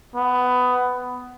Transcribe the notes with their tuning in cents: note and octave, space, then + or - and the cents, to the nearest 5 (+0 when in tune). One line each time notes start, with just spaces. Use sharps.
B3 +15